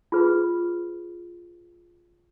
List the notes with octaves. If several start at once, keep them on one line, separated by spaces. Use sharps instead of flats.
F4 G#4 B4